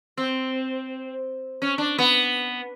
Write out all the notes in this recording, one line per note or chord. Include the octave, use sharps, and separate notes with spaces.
C4
C#4
D4
B3